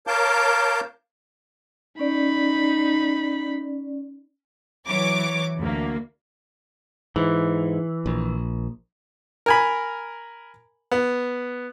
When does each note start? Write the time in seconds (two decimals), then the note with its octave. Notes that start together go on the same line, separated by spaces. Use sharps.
0.07 A#4 C#5 F5 A5 D6 G6
1.99 C#4 D#4 D5 B5
4.88 E3 F#3 C#5 D6
5.58 D2 A#3
7.16 G#2 E3
8.06 A#1
9.46 A#4 G#5 B5
10.91 B3